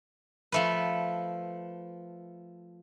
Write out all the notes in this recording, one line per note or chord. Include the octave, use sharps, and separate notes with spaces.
F3 A3 B4